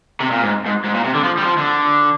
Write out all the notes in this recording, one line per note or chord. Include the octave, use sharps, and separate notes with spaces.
C3
A#2
G#2
G#2
G#2
A#2
C3
D3
F3
G3
F3
D3